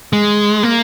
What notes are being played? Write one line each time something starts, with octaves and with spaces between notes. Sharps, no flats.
G#3
A#3